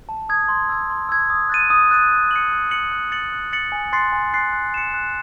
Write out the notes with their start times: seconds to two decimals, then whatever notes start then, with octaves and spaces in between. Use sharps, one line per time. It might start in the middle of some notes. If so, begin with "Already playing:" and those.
0.09 A5
0.29 D#6 G#6
0.49 C6
0.69 E6 G#6
0.90 C6
1.09 E6 G#6
1.30 D#6
1.49 F#6 A6 D#7
1.70 D#6
1.91 F#6 A6 D#7
2.11 F#6
2.31 C#7 F#7
2.52 F#6
2.71 C#7 F#7
2.92 F#6
3.12 A6 C#7 F#7
3.32 F#6
3.53 A6 C#7 F#7
3.72 G#5
3.92 C6 F#6 A6 C7
4.12 G#5
4.33 C6 F#6 A6 C7
4.53 F#6
4.74 C#7 E7
4.94 F#6